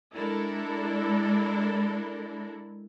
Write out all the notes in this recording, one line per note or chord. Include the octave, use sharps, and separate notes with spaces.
G#3 D4 E4 A4 A#4